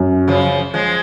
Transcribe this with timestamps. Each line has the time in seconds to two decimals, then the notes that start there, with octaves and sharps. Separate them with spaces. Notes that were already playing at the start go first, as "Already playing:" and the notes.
Already playing: F#2
0.28 C#3 F3
0.74 F3 G#3